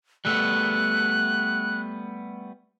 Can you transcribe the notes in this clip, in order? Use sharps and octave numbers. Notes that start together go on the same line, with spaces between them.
G3 A3 B3 F#6